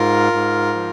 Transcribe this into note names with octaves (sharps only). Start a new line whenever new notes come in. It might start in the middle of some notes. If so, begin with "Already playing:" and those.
Already playing: G#2 F4 A#4
G#2
F3